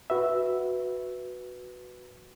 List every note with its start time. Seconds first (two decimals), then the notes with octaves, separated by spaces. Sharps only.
0.10 F#4 B4 E5